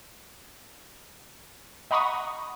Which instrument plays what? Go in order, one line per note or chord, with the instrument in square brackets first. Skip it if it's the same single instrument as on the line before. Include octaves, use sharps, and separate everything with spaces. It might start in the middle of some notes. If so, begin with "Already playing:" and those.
[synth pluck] D#5 F#5 A#5 B5 C#6 D#6